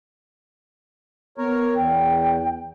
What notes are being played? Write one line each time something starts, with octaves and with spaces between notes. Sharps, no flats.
B3 A#4 C#5
E2 G5